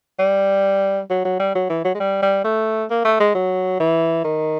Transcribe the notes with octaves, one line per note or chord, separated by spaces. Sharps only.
G3
F#3
F#3
G3
F#3
E3
F#3
G#3
G3
G3
A3
A#3
A3
G#3
F#3
E3
D#3